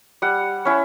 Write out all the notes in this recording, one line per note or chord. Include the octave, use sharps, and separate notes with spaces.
G3 F#5
C#4 E4